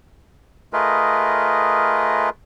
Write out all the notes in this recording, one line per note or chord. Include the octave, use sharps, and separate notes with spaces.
A3 F4 G#4 A#4 B4 D#5